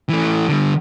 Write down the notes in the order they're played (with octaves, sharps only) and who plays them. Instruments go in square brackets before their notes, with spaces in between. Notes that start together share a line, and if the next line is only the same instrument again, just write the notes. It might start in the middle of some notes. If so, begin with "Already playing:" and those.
[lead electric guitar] E3 A3
D3 G3